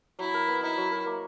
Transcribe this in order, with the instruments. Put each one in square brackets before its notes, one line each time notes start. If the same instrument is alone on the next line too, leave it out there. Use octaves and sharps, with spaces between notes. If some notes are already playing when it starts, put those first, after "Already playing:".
[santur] F#3 [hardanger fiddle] E4
[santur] A#4
B3
[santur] D#4 [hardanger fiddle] E4
[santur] F#3
A#4
A#3